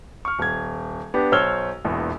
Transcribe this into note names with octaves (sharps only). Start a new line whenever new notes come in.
C#6 F6
D#1 G#6
B3 D4 G4
B1 C5 C#5 E6 F6 G7
E1 A#1 E2